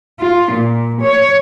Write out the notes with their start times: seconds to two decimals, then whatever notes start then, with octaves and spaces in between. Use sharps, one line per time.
0.20 F4
0.52 A#2
1.02 C#5